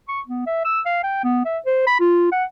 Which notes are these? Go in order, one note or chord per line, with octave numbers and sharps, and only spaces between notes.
C#6
B3
E5
E6
F5
G5
B3
E5
C5
B5
F4
F#5